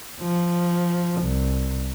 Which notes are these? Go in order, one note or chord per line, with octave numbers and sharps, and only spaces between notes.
F3
C2